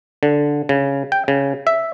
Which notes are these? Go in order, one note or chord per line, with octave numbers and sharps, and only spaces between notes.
D3
C#3
G5
C#3
E5